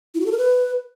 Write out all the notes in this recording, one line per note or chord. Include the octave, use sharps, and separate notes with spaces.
E4
F#4
A4
A#4
B4